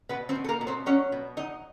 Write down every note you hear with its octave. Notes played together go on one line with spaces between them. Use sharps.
B2 B3 B4
C4 C5
B2
A4
A#3 A#4
B2
C4 C5
F#3 C#4 C#5
B2
F#3 D#4 D#5